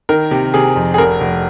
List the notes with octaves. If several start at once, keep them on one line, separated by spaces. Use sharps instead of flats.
D#3 A#4
C3
C3 G#4
F2
G#4
F1 A#4
F1